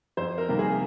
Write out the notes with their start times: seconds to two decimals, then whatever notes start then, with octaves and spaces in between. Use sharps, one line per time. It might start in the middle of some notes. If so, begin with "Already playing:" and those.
0.17 F2 C5
0.38 A#4
0.48 C3 D#3 G3 A#3
0.59 G#4